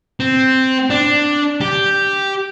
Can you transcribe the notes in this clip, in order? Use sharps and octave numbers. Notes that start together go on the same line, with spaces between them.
C4
D4
G4